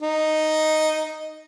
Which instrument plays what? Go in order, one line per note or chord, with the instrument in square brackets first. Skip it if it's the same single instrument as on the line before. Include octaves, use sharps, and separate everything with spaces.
[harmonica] D#4